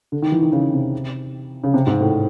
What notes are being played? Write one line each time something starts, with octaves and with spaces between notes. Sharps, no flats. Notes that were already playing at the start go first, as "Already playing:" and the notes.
D3
D#3
E3
D#3
C#3
C3
C#3
C3
G#2
A2